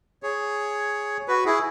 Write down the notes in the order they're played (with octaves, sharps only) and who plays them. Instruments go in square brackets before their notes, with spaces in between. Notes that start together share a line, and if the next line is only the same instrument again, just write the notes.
[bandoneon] G#4 C#5
F#4 B4
E4 G#4